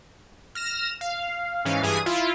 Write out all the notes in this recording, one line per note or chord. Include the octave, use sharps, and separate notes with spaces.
F6 A#6 E7
F5
G#2 E3 C#4 F5
G2 E3 G#4 G#5 D#6 D#7
E4 F4